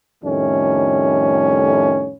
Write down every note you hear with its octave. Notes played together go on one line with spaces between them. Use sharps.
F2 A2 D#3 G3 A3 C#4